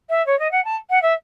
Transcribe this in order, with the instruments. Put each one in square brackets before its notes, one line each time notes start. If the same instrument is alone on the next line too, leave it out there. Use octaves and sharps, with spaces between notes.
[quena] E5
C#5
D#5
F#5
A5
F#5
E5